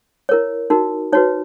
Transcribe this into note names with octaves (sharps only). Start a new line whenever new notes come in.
E4 A#4 C#5
D#4 F#4 A#4
D#4 F#4 B4 C#5